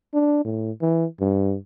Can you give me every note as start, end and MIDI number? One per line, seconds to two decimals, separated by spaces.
0.14 0.42 62
0.45 0.71 45
0.81 1.05 52
1.20 1.56 43